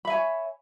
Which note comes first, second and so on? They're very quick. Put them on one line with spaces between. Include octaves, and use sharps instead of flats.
B5 E5 G#5 C#5